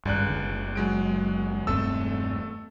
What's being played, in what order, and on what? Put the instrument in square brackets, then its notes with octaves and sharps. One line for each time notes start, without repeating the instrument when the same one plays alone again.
[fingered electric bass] G#1 G2 [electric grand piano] C#2 D5 F#6
[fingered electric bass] F#1 D3
[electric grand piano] F#3 G#3 D7
[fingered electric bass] E1 G2 C4 [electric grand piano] A3 A4 E6